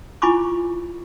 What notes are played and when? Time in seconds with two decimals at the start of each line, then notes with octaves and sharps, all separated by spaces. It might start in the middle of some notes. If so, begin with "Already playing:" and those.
0.22 E4 F4 G#5 B5 C#6 D6